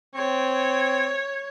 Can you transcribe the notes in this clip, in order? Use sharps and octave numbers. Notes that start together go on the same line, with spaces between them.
C4 C#5